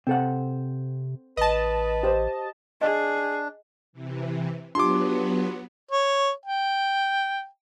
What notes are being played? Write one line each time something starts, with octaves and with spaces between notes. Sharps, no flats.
C3 C4 A4 F#5
A1 B4 D#5 A5
G4 C5
D4 G#4 D#5
C3 E3
F#3 B3 D4 F4 G4 C6 D6
C#5
G5